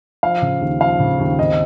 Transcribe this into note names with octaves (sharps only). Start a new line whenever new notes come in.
F3 F5
C#3
D#2
F3 F5
C#3
D#2
G#1 D#5